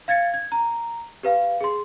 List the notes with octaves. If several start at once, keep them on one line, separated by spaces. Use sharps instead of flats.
F5 G#6 A6 C#7
G#6
A#5
G4 B4 F5
G#4 C6